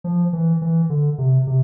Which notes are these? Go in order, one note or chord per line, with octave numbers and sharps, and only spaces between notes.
F3
E3
E3
D3
C3
C3